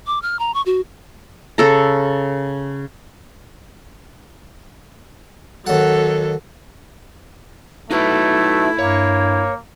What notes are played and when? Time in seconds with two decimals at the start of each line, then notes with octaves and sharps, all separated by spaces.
0.07 D6
0.22 F6
0.39 A#5
0.54 C#6
0.66 F#4
1.58 C#3 A4 A#5
5.67 D#2 F#3 A4 F#5
7.91 A3 D#4 E4 F#4 B4
8.79 G2 A#3 C#5